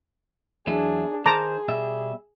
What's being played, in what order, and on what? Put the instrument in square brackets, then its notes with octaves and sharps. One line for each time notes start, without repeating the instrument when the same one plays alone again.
[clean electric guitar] E2 F#3 E4 [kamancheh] D4 G#4
[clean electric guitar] D#3 C5 [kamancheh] G#4 [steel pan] A5 A#5 D6
[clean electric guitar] B2 G3 E5